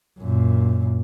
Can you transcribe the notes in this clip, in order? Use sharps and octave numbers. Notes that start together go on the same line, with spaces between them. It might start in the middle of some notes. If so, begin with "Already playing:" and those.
F#2 A#2